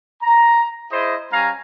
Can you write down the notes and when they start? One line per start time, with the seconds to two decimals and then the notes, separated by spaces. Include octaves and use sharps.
0.22 A#5
0.91 E4 G#4 C5 D#5
1.32 G3 C#4 F5 G#5 A#5